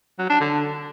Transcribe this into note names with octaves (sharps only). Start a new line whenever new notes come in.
F#3
D4
D3